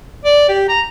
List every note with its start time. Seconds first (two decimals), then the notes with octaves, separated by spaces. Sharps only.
0.25 D5
0.49 G4
0.69 A#5